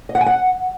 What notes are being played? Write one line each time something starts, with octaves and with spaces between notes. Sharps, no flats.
D#5
F#5
G#5
F#5